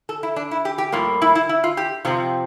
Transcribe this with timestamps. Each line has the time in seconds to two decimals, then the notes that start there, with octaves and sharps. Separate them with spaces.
0.09 A4
0.23 E4
0.36 D4
0.51 E4
0.65 G4
0.78 G4
0.92 A2 G3 A#3 F4
1.22 E4
1.35 E4
1.49 E4
1.64 F4
1.77 G4
2.05 F2 C3 F3 C4 F4